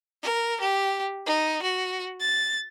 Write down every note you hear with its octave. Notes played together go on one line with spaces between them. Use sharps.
A#4
G4
D#4
F#4
A6